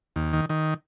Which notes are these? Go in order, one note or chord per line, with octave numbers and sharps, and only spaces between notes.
D#2
D#3
D#3